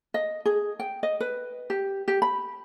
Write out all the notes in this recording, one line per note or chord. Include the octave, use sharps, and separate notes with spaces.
D#5
G#4
G5
D#5
B4
G4
G4
B5